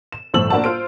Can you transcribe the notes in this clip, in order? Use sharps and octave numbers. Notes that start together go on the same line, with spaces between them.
E7
G1 A2 F3 E6 F#7
A#3 D4 F#4 C5 A5
F4 C5 D7